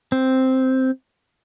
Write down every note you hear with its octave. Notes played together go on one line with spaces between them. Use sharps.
C4